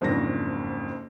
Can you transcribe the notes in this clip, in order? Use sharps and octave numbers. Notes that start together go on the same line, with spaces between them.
F#1 F2 G#2 C#3 D4 A#6